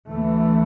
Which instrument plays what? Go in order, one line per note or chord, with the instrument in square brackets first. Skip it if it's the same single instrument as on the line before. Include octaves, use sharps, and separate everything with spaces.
[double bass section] D2 E3 A3